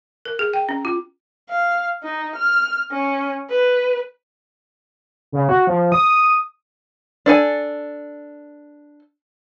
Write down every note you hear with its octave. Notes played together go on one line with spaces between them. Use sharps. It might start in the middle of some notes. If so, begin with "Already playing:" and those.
A#4
G#4
G5
C#4
F4
F5
D#4
F6
C#4
B4
C#3
F#4
F3
D#6
D4 A4 G#5